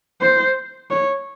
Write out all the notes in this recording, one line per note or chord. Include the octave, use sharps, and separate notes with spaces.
C5
C#5